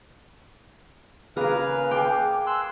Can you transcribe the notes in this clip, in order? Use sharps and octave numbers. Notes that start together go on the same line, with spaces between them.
C#3 A#3 G#4 A#4 B4 F6
G#4 G5 D6
C6 E6 F#6